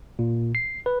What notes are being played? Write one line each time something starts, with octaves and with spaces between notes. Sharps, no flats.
A#2
C7
B4